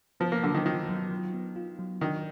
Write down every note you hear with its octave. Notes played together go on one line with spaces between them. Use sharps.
F3 B3
A#3
D3 F#3
D#3
D#3 F4
F#3
F#3
B3
F4
F#3
D#3 D4